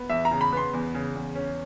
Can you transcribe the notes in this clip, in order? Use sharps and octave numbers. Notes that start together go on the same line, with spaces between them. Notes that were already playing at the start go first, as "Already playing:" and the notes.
Already playing: B3
E2 E5
A#5
C#3
B5
B3 C6
E2
C#3
E2
C#4